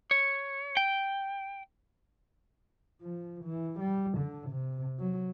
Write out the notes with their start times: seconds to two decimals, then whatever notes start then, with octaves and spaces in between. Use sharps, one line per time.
0.11 C#5
0.77 G5
3.02 F3
3.45 E3
3.80 G3
4.18 D3
4.51 C3
5.00 F#3